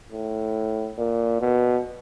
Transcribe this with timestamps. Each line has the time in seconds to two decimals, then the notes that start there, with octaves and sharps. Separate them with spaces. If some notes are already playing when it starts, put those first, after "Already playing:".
0.12 A2
0.98 A#2
1.41 B2